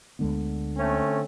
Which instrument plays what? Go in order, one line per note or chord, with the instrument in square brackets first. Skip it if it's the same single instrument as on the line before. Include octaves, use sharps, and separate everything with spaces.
[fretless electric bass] D2 G#3 B3 [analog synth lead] D3
[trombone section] A3 C4 C#4